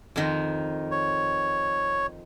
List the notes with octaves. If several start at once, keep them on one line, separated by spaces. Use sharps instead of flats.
F2 D#3
C#5